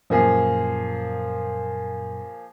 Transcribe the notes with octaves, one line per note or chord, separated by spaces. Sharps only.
F#2 A#2 F3 A#3 G#4